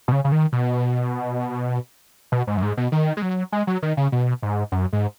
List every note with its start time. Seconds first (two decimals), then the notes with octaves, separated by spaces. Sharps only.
0.08 B2
0.12 C#3
0.24 C#3
0.32 D#3
0.52 B2
2.32 B2
2.47 G#2
2.57 F#2
2.62 G#2
2.77 B2
2.92 D#3
3.17 G#3
3.22 F#3
3.52 G#3
3.67 F#3
3.82 D#3
3.97 C#3
4.12 B2
4.42 G#2
4.72 F#2
4.93 G#2